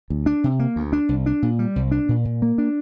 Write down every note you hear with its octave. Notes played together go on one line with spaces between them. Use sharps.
D2
D4
C3
A#3
D2
D4
C2
D4
A#2
G3
C2
D4
A#2
A#2
A#3
D4